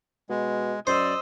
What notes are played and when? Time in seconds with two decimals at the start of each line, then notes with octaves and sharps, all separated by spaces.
0.30 B2 G#3
0.87 F#2 C5 D5 D#5 E6